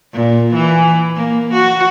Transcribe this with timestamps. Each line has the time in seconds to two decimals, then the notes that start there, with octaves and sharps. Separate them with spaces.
0.13 A#2
0.54 E3
1.16 A#3
1.53 F#4